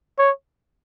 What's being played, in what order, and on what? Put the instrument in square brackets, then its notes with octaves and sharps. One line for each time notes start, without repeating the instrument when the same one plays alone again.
[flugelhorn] C#5